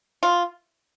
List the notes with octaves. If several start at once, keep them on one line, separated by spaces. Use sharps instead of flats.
F4